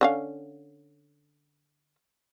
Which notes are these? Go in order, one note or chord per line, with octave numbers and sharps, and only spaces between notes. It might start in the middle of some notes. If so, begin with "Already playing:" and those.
D3 C#4 F5